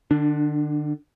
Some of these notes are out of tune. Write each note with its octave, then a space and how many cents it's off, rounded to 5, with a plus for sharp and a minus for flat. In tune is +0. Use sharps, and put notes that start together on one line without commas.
D3 +35 D4 +0